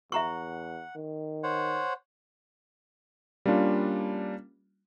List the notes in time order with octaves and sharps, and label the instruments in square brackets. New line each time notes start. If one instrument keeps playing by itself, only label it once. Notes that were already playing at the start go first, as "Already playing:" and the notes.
[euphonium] E2 [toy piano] E5 A#5 C#6 [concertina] F#5
[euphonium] D#3
[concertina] C5 C#5 F#5
[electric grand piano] G3 A#3 C#4 D4 F4